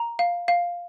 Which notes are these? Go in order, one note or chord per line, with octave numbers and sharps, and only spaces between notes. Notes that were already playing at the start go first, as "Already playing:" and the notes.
Already playing: A#5
F5
F5